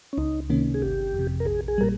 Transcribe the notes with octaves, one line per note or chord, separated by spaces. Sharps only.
C#4
C#2 D#4
C3 D#3 A#3 C#4
G#4
G1 G4
F2
C3
A#4
A#1 G#4
G#4
A#2 G3 A#4